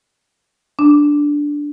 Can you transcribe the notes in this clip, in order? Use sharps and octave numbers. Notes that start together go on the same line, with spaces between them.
D4